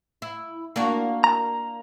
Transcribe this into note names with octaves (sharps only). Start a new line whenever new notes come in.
E4
A#3 D4 F#4
A#5